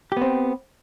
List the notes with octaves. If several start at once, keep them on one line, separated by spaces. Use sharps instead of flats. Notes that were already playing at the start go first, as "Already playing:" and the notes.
B3 C4 G4